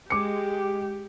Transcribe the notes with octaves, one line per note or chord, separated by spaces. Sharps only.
G#3 G4 D6 C#7